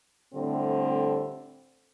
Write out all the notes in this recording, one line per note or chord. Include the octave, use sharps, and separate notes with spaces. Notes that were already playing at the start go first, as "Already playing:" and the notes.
A2 D3 G3 A3 C4